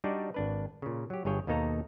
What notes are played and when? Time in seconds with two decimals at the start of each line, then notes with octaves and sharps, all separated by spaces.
0.04 G3 D4 D#4 F#4 D5
0.34 G#1 D4 B4
0.82 A#2 C#3
1.10 F#3 G4
1.25 G1 G2 G#4 C#5 G5
1.47 D#2 B2 A#3 D#4 A4 A#5